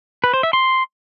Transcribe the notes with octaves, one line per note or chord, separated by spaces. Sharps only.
B4
C5
E5
C6